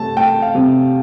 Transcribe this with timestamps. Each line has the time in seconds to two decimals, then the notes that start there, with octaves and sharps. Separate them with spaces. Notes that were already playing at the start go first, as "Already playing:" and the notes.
Already playing: C3 A3 A5
0.17 A3 G5
0.42 F5
0.55 C3